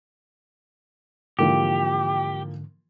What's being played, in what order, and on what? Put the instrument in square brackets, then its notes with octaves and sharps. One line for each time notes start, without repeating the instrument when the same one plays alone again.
[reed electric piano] G#2 D3 [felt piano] E3 F3 A#3 [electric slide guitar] G4 [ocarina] G5